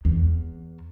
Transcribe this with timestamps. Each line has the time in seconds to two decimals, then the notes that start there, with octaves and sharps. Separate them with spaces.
0.05 E2